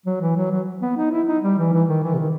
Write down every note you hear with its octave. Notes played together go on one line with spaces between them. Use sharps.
F#3
E3
F#3
F#3
B3
D#4
E4
D#4
G3
E3
E3
D#3
E3
C3
D#3